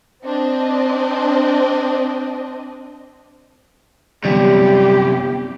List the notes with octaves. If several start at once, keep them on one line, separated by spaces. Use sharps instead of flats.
C4 D4 D#5
G1 F#2 C3 E3 G3 G4